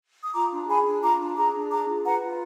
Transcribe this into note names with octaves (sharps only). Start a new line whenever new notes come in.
D#6
F4 A#5 D6
D4
G#4 G#5 B5
D4
F4 A#5 D6
D4
G#4 A#5 D6
D4
G#4 A#5 D6
F4
B4 F#5 A#5
F4